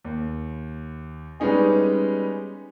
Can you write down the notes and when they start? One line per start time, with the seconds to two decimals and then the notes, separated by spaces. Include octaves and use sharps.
0.05 D#2
1.40 G3 G#3 B3 C#4 D#4 G#4